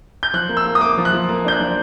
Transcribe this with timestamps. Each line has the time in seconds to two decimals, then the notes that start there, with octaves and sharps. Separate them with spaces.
0.23 G6
0.34 F3 F#6
0.49 A#3
0.57 E6
0.65 A#3
0.75 D#6
0.81 A#3 D6
0.98 F3
1.05 F#6
1.13 F3
1.29 A#3
1.45 D4 G6
1.53 F#6
1.60 F3